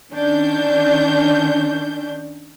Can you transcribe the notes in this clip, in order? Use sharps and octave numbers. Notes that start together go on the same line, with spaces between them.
D#3 C#4 D4 G6